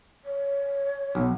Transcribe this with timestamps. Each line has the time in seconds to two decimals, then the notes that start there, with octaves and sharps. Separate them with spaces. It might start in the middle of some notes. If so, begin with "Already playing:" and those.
0.25 C#5
1.15 B1